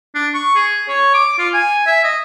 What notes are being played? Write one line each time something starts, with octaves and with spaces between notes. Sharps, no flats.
D4
C#6
G#4
C#5
D6
F4
G#5
E5
D#5